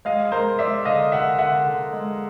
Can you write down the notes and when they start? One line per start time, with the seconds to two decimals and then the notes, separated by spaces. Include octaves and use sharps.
0.05 G#3 D#5 F5
0.32 G#3 A#4 C5
0.59 G#3 D5 E5
0.85 D3 D#5 F5
1.12 D3 E5 F#5
1.39 D3 E5 F#5
1.66 D3
1.93 G#3